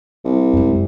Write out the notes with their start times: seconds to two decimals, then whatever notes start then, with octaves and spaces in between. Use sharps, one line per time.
0.25 C2
0.53 F#2 G#3